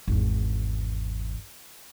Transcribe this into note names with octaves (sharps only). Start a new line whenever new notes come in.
G#1 E2